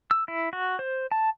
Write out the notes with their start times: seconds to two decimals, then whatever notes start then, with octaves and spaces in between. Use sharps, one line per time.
0.11 E6
0.28 E4
0.53 F#4
0.79 C5
1.12 A5